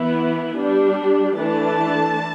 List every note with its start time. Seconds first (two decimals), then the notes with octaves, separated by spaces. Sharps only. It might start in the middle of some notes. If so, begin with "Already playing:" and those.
Already playing: E3 B3 E4
0.57 G3 D4
1.36 E3 A3 D4 A5